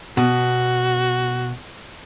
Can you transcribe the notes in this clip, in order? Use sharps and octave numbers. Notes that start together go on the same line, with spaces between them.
B2 F#4